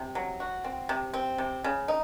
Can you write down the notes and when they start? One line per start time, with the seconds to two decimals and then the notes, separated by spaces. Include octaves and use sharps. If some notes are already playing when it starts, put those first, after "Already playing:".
Already playing: C3
0.15 F#3
0.40 F#4
0.64 C4
0.89 C3
1.14 C4
1.38 C3
1.64 C#3
1.88 D#4